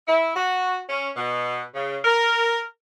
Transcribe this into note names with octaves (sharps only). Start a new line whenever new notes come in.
E4
F#4
C#4
B2
C#3
A#4